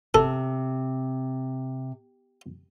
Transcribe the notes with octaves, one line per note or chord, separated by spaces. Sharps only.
C3 A4